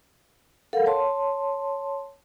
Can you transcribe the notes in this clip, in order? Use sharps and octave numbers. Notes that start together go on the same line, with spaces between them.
A4 A#4 F5 F#5
C#5 A5 C6